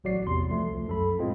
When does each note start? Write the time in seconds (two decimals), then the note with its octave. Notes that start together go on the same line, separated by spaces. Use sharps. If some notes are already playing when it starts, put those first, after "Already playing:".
0.04 A1 F#3 F#4 D5 C7
0.26 E2 C3 C6
0.48 C2 F3 A3
0.88 F#2 A4 B5
1.19 A2 G#3 C4 F4